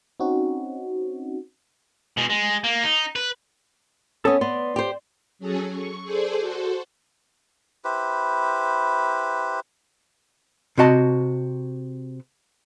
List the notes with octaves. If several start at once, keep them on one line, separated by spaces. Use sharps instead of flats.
C4 C#4 D#4 F#4
B2 G#3
G#3
A#3
D#4
B4
B3 C#4 A4 D#6
B3 D5 C6
G4 C5
F#3 C#4 G#4 A4
C#6
G#4 A4 C5 D5
F#4 A4 C5
E4 G4 B4 C5
C3 C4 F#4 D#5 A5